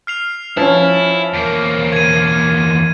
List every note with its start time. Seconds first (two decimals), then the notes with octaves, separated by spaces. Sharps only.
0.07 F6 C7 F7
0.57 F3 C#4 E4
1.34 E2 A#3
1.93 G#6 D#7